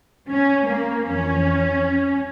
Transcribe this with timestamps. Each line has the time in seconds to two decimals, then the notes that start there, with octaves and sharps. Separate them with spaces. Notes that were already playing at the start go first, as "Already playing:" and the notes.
0.29 C#4
0.68 A#3
1.07 F2 E3 C#4